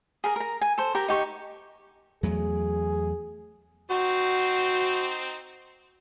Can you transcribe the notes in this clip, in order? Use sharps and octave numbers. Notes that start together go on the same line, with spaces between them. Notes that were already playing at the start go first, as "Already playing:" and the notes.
G#4 A#4 A#5
A#4 A#5
G#5
A4 C5
G4 A#4 A#5
D#4 G4 C#6
E2 F#3 A3 G#4
C4 D#4 F#4 C5